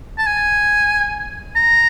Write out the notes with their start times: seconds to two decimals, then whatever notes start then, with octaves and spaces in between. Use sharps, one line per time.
0.18 A5
0.26 G#5
1.56 A#5